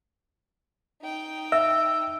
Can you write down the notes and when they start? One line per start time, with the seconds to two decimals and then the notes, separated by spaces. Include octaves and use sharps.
1.02 D#4 G5
1.52 E5 E6